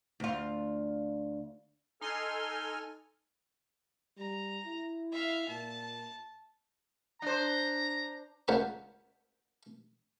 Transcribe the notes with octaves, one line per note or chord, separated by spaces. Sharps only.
D2 F4
D#4 A4 G#5 C6 F6
G3 A#5
E4
E5 F5
A#2 A5
D4 C5 A#5
C#2 A#3 C5 F#5 A5 B5